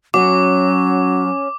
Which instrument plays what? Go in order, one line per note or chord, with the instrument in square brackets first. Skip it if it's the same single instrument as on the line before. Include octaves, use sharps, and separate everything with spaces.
[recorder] F#3 [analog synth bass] C#4 [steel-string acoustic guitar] F#4 C#5 [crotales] D6